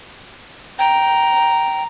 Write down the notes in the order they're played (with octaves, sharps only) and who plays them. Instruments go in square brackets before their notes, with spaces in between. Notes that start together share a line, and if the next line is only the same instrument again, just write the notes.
[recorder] G5 [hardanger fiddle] A#5